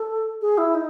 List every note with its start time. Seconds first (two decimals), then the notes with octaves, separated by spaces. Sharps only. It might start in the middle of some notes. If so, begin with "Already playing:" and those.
Already playing: A4
0.41 G#4
0.58 E4
0.75 D#4